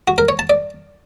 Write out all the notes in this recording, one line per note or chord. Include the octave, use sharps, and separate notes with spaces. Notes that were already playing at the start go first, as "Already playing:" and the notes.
F#4
A#4
C#5
A5
D5